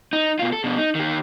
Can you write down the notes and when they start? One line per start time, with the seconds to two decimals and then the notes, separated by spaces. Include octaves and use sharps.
0.13 D#4
0.39 B2 F4
0.53 A4
0.64 B2 D4
0.78 D#4
0.95 D#3 G4